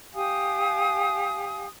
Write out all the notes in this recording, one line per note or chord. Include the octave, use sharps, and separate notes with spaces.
G4 F5 G#5 D#6